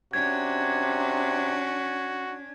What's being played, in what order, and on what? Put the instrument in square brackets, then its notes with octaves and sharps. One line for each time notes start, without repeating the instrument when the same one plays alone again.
[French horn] C3 [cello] C#4 D4 [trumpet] F#4 [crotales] G#6